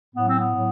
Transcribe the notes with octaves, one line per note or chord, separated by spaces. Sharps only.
A2 F#3 B3
C4
B3
A2 F#3